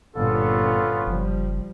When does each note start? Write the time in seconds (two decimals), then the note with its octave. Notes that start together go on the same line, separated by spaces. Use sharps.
0.16 G1 A#2 B3 C#4 F4 A4
1.06 F#1 F3 G3